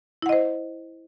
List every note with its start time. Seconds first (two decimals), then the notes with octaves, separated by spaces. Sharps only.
0.22 E4
0.26 F#5
0.29 D#5
0.33 C5